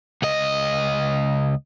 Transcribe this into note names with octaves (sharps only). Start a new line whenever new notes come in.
C#2 D#5